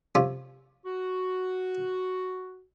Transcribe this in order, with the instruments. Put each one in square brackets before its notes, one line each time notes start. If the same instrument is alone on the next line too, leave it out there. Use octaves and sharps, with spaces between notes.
[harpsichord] C3 C#4 F4
[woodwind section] F#4